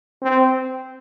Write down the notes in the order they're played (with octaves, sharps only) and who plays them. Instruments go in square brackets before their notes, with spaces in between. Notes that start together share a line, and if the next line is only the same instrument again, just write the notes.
[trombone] C4